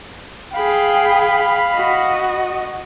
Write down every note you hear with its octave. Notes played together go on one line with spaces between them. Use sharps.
G#4 F5 G5 B5
F#4 D#5